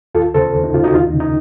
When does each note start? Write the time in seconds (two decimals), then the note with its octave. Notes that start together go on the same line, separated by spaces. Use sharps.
0.15 D#2 F4 A4
0.34 C#3 A4 C5
0.54 D#2
0.64 D#4
0.74 C#3 F4
0.84 D#4 F#4
0.94 D#2 F4
1.07 D#4
1.14 C#3
1.20 D#4